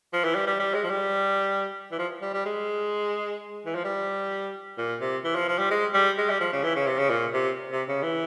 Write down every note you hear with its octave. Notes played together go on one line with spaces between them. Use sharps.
F3
E3
G3
G3
G3
G#3
F3
G3
E3
F3
G3
G3
G#3
E3
F3
G3
A#2
C3
E3
F3
F3
G3
G#3
G3
G#3
G3
F3
C#3
E3
C#3
C3
C#3
A#2
C3
C3
C#3
E3